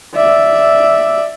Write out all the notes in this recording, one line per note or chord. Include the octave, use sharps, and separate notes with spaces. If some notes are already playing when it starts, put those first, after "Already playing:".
D5 E5